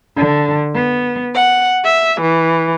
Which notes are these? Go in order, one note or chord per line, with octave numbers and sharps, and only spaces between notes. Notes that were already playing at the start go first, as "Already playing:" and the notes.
D3
B3
F#5
E5
E3